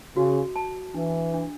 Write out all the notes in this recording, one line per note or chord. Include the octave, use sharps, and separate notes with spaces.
C#3 F#4
A5
E3 D4
D4